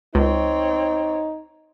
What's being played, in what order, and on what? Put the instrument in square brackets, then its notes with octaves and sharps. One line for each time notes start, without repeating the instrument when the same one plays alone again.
[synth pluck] C#2 [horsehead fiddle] C4 C#5 [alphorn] D#4